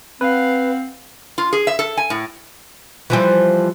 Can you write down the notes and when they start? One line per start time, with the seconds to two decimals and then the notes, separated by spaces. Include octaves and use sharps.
0.21 C4 B4 F5 F#5
1.38 F4
1.53 G#4
1.67 E5
1.79 A4
1.97 G#5
2.10 A2
3.10 E3 F3 G3